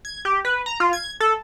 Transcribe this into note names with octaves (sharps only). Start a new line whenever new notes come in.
G#6
G4
B4
A#5
F4
G#6
A4